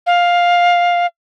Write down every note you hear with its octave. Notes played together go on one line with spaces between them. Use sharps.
F5